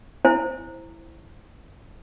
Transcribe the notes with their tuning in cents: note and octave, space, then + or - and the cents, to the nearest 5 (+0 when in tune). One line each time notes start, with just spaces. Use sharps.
E4 +0 C5 +0